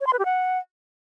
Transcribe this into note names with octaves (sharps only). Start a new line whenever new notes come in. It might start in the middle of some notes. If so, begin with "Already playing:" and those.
C#5
C6
B4
G4
F#5